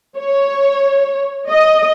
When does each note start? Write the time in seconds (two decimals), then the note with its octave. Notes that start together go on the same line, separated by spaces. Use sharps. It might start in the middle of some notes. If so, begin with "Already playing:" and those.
0.18 C#5
1.49 D#5